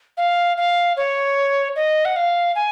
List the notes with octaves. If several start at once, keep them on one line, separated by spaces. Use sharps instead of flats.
F5
F5
C#5
D#5
F#5
F5
G#5